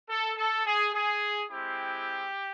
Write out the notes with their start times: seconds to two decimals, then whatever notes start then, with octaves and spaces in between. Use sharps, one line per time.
0.09 A4
0.36 A4
0.66 G#4
0.93 G#4
1.50 G#3 C4 E4 G4